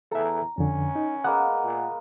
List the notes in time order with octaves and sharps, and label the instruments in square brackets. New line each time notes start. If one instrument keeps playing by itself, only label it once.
[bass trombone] E2 [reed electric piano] A4 E5 [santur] A#5
[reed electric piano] F2 D3 [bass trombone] C#4
[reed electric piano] D#4
[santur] G#3 A#3 B3 [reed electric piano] F#5
[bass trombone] A#2